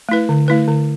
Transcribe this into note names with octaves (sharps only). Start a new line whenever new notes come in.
A3 E4 B4
D3
A3 E4 B4
D3